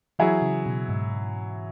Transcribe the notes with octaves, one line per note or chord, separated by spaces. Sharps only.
E3 F#3 E4 G#4
C#3
B2
G#2